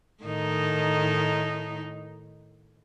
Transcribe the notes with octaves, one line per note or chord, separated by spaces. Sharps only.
A2 D#3 D#4